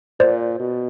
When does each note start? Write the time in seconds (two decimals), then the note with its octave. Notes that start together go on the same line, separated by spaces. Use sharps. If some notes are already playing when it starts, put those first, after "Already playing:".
0.20 A#2 C5 D5
0.60 B2